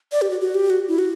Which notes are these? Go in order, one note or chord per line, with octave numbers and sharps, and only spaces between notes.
D5
G4
F#4
F#4
G4
F#4
E4
F#4